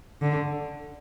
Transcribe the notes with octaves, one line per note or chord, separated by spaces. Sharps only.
D3